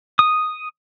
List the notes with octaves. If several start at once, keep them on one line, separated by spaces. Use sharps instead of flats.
D#6